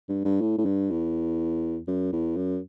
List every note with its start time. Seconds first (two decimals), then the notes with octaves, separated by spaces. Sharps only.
0.09 G2
0.25 G2
0.41 A2
0.58 A2
0.65 G2
0.90 E2
1.88 F#2
2.12 E2
2.36 F#2